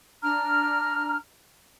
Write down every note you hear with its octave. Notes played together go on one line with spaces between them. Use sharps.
D4 A#5 F6